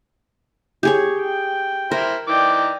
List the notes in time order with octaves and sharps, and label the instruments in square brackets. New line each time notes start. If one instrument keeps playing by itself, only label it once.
[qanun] G4 G#4 C#5
[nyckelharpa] G5
[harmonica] E4 C5 [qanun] A#4
[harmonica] E3 D#4 D6 [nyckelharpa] D5 G5